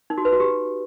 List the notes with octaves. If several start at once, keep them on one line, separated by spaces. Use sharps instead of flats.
D#4
F#4
B4
F#4
G4